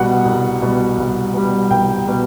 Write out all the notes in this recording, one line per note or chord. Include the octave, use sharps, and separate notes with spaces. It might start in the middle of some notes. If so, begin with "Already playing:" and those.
Already playing: C2 B2 G3 F#5
C2
B2 G3
C2
B2 G3
C2 G5
B2 G3